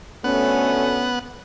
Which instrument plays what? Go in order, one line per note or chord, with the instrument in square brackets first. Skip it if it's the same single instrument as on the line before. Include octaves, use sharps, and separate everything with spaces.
[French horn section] D2 A3 C#4 [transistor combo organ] B3 F#5